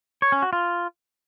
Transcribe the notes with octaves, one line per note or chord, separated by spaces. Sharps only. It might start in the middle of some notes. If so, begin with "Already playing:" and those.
C#5
C#4
F#4
F4